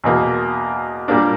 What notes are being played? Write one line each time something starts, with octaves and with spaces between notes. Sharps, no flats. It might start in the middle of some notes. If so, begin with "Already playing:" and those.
E2 B2 A#3
A#2 G3 A#3 D4